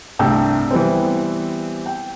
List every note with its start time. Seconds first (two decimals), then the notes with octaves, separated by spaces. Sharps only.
0.19 C2 G2 A3 G5 E6
0.71 E3 G3 B3 C4
1.86 G5